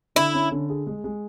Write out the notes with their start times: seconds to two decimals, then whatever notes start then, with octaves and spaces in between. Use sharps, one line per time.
0.16 D3 E4
0.34 C#4
0.52 D3
0.69 G#4
0.87 G#3
1.04 G#3